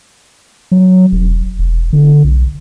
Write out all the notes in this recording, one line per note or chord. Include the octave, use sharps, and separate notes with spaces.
F#3
E1
E1
D3
B1